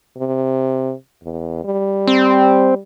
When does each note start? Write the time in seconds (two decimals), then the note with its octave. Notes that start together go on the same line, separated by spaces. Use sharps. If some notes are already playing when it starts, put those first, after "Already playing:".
0.18 C3
1.23 E2
1.65 G3
2.07 C4